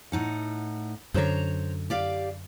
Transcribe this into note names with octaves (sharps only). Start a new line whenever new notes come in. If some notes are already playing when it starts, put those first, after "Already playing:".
A2 D#4 F#5
F#2 D3 C5 C#5 A#5
G4 D5 F5